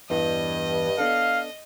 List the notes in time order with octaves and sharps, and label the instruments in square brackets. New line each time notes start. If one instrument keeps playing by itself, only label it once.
[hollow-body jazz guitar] E2 E3 [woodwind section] G2 [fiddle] D#5
[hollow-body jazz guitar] B3 D4 A4 [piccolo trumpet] F5